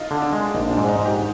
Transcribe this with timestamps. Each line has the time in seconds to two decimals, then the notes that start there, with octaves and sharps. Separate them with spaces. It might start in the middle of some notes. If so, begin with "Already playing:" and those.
Already playing: D#4 F4
0.11 D3
0.22 D4
0.33 G#3
0.54 A#1 D#4
0.71 D4
0.77 G#2
0.89 D#4
0.99 G#2
1.05 G4